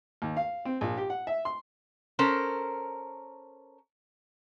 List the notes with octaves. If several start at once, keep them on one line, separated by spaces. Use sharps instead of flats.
D#2
F5
C4
A#1
G4
F#5
E5
C6
C#4 A4 A#4 C5